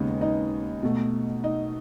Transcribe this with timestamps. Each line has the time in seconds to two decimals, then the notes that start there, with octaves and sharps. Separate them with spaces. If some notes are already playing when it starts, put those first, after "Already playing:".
Already playing: D#2 C#3 G#3 B3 D#4 D#5
0.21 D#4 D#5
0.83 B2 A3
1.43 D#4 D#5